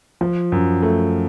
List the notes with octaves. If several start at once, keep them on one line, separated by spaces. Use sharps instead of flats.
F3
F#2
A3